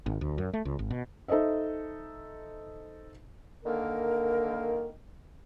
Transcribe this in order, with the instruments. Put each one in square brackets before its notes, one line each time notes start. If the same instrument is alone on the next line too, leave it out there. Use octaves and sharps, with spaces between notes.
[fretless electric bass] G#1
D2
F#2
A3
C#2
G#1
B2
[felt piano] D#4 A4 C5 D#5 E5
[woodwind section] D3 D#3 A#3 A#4